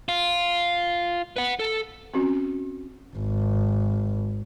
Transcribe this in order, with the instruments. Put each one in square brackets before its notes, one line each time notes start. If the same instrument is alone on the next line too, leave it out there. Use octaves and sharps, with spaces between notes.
[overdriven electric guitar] F4
B4 F#5
A4
[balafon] C4 C#4 F#4
[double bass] G#1